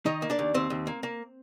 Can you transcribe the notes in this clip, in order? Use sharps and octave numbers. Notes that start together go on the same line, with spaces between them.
D#3 D#4 D#5
A#3
D4 D5
D#2
D#2 C4 C5
D#2
A#3
A#3